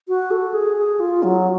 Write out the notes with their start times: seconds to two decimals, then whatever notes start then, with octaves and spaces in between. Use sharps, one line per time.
0.08 F#4
0.31 A4
0.54 G#4
0.77 G#4
1.00 F4
1.23 F#3